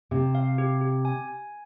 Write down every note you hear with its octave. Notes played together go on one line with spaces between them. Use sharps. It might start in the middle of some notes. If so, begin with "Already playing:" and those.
C3 G4
F5
G4
G4
G#5
G#5